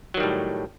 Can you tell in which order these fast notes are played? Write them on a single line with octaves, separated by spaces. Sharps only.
F#3 D#3 G3 A2